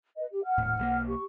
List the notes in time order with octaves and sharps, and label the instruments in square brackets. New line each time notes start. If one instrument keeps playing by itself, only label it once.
[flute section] B4 D#5
G4
F#5 F6
[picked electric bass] D#1 A2
B1 G#3 A#3
[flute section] G4 C#6